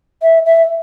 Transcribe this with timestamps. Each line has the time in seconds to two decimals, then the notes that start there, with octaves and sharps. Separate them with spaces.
0.22 E5
0.46 E5